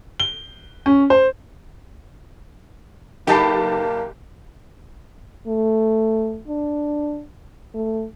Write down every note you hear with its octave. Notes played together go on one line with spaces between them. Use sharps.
G7
C#4
C5
F#1 A#3 D#4 G4 A4 B4 A5 C7
A3
D4
A3